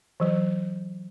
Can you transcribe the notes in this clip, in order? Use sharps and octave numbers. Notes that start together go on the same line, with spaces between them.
E3 F#3